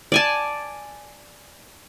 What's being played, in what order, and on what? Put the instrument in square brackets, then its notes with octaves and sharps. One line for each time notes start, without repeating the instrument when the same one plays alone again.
[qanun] D5 G#5 A5